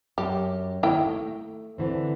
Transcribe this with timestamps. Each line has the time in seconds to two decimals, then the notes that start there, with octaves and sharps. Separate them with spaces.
0.18 F#2 G4
0.83 D#3 A#3 E4 G5
1.06 A3
1.78 D3 E3 C4